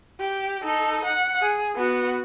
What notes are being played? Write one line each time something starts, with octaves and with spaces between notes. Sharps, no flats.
G4
D#4 A4
F#5
G#4
B3 F#4